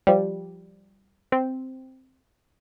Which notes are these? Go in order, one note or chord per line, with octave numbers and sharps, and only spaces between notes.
F3 G3
C4